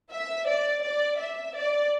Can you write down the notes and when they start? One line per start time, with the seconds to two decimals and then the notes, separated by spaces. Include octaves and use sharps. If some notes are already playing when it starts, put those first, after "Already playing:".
0.11 E5
0.47 D5
0.83 D5
1.19 E5
1.55 D5